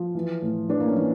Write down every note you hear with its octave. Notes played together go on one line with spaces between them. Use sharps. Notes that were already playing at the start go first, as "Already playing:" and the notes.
Already playing: F3
E3
A2
E3 D4
A#3
C#4
E3